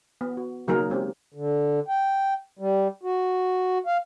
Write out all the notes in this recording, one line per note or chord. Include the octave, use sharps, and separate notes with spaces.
B3
F#4
C#3 F#3 A#3 D#4 G#4 A#4
G#3 C4 C#4 G4
D3
G5
G3
F#4
F5